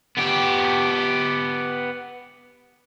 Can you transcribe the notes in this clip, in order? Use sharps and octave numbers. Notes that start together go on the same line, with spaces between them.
B3 G4